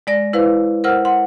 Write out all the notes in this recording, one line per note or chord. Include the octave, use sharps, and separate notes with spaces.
G#3 D5 A#6
E4 B4 C5 F5
A#4 C5 F#5 E6 F6
F#5 C6